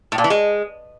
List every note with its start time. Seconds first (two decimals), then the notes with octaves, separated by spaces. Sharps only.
0.12 A2
0.18 A#2
0.24 E3
0.30 G#3